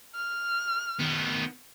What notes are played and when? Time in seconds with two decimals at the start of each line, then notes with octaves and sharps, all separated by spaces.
0.15 F6
0.99 D#3 B3